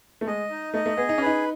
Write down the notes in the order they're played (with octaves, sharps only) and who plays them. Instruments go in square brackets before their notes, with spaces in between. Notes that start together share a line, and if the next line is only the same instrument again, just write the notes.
[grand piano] A3
[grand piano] G#3 [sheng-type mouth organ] D#5
[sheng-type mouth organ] D#4
[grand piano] A3 [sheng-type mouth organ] D#5
[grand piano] A3
[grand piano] B3 [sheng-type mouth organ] G#4
[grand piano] D#4
[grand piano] C#4 [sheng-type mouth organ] B4
[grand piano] D#4